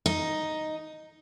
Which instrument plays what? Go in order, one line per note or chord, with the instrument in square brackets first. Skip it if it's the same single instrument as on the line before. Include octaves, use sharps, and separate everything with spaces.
[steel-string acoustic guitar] D#4